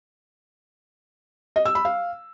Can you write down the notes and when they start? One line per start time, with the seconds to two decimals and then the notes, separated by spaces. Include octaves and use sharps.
1.56 D#5
1.65 E6
1.75 B5
1.85 F5